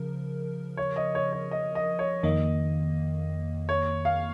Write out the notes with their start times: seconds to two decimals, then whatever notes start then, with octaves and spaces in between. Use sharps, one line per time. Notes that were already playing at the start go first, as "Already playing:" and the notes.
Already playing: C#3 F3 A#4
0.77 C#5
0.96 D#5
1.15 C#5
1.33 C#5
1.51 D#5
1.75 D#5
1.99 C#5
2.23 F2 D#3 A#3 D#5
3.69 C#5
4.05 F5